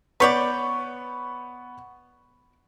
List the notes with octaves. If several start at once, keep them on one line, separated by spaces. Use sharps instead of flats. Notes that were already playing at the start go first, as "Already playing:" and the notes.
B3 B4 C#5 D5 C#6 G6